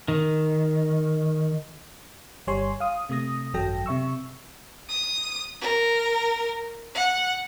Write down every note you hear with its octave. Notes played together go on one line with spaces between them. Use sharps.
D#3
G1 G3 C#5 G#5 C6
F5 D#6
C3 A3 D#6 A#6
G#1 F#2 F#3 A4 G5 A#6
C3 E5 C#6 E6
D#6
A#4
F#5